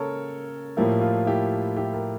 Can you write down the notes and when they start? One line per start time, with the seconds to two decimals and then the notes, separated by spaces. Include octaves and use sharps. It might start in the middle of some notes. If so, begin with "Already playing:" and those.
Already playing: C#3 A#3 A4 A#4 C#5
0.77 A2 F3 A#3 E4 G4
1.01 F4
1.27 E4 G4
1.76 E4 G4
1.93 G4 A#4